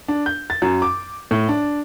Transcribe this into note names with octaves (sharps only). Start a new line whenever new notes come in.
D4
G6
A6
F#2
D6
A2
D4